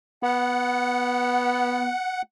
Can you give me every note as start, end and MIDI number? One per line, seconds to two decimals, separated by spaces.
0.23 1.91 59
0.23 2.22 78